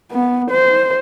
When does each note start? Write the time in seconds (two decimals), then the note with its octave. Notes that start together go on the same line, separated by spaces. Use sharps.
0.11 B3
0.50 C5